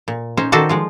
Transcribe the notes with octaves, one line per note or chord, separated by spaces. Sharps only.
A#2
C#4 D#4 C5
D#3 D#4 F#4 A4 C5 D5
F3 G#3 F4